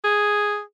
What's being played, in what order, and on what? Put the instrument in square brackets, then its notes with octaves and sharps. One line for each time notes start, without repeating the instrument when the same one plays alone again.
[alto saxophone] G#4